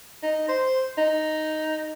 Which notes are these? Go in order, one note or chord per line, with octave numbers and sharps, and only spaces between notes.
D#4
C5
D#4